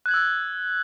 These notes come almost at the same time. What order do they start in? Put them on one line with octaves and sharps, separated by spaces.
F#6 G#6 F#7 E6